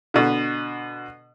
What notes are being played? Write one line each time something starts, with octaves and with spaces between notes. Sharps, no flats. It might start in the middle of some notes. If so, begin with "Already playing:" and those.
B2 D3